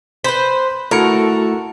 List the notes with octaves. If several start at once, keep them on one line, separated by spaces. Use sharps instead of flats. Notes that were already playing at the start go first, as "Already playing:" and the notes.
B4 C5 B5 B6
A3 E4 F#4 A4 A#4 C#7